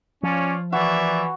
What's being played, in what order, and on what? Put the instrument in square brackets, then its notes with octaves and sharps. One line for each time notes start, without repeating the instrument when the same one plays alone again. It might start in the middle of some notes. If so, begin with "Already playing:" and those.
[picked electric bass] F3 [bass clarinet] C#4 [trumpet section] F4 C#5 D5
[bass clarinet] E3 [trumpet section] A#3 D5 E5 [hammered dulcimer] F#4